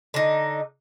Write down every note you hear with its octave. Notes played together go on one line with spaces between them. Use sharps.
D3 D#4